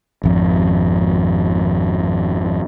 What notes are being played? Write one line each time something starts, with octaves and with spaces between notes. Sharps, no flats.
G#1 F2